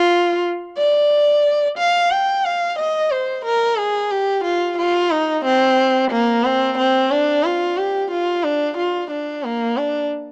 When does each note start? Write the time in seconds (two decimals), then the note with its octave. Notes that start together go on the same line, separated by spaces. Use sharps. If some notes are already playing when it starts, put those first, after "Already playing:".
Already playing: F4
0.78 D5
1.78 F5
2.12 G5
2.45 F5
2.79 D#5
3.11 C5
3.45 A#4
3.78 G#4
4.11 G4
4.44 F4
4.78 F4
5.11 D#4
5.45 C4
6.11 A#3
6.45 C4
6.78 C4
7.11 D4
7.45 F4
7.77 G4
8.11 F4
8.44 D4
8.77 F4
9.11 D4
9.44 A#3
9.77 D4